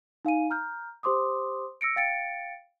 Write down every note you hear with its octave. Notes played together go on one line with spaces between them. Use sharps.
D#4 F5 G#5 D#7
A#5 F6 G6
G4 C5 C6 D6 D#6
E6 A#6 C#7 D7
F5 G5 A6 C#7 D7